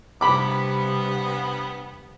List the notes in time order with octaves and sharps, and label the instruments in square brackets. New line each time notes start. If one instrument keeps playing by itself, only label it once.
[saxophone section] G2 B3 [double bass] C3 G3 [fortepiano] B5 D6